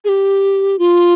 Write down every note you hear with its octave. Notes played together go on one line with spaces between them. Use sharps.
G#4
G4
F4